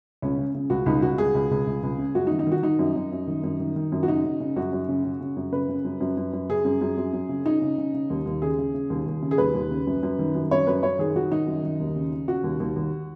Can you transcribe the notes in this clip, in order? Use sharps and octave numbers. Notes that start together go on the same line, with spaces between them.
C#2 C#4
C#3
C#3
C#2 F#4
C#2 D#4
C#2 F#4
C#2 G#4
C#2
C#2
C#2
C#2
C#3
F#2 F#4
D#4
D#3
D#4
D#3 F#4
D#3 D#4
F#2
F#2
F#2
D#3
F#2
D#3
D#3
F#2
F#4
C#3 D#4
C#3
C#3
F#2 F#4
F#2
C#3
C#3
C#3
F#2
C#3 B4
C#3
F#2
F#2
F#2
F#2
C#3 G#4
F#2
F#2
F#2
F#2
C#3
C#3 D#4
C#3
C#3
C#3
D#2
D#2
C#3 G#4
C#3
C#3
D#2
D#2
C#3
G#4
D#2 B4
D#2
C#3
F#2
F#2
D#3
F#2
F#2 C#5
F#2 B4
F#2 C#5
D#3 G#4
D#3 F#4
D#3 D#4
F#2
D#3
D#2
C#3
C#3
C#3 F#4
D#2
D#2
D#2